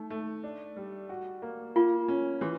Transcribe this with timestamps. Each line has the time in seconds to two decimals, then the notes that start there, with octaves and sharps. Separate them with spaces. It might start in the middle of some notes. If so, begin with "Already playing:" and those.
Already playing: A3 D#4
0.10 A3
0.43 D4
0.76 G3
1.09 F#4
1.42 A#3
1.76 A#3 F4
2.08 C#4
2.41 E3 G4